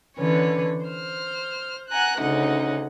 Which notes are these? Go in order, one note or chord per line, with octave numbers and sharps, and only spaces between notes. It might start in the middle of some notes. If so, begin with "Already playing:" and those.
D3 E3 C#4 B4 C#5
C5 F6
F#5 G#5 A#5 F#6
D2 C#3 C#4 D#4 F#5